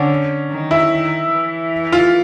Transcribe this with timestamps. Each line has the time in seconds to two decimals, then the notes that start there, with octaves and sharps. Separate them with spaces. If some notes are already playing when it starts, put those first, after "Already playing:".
Already playing: D3 C#4
0.50 D#3
0.71 E4
0.91 D#3
1.31 E3
1.93 F4